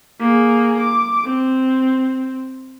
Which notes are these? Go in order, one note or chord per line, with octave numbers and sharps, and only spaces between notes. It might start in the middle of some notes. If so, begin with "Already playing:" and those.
A#3 G#4
D6
C4